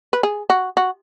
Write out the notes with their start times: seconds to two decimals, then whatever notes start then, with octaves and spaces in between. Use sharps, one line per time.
0.13 B4
0.23 G#4
0.50 F#4
0.77 F#4